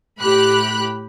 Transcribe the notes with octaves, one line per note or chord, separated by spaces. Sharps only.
A2 G4 B5 F#6